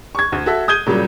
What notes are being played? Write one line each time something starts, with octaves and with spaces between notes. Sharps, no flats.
C#6 G#6
D2
F#4 A4 E5
D#6 G6 G#6 D#7 G7
A#2 C#3 F#3 G3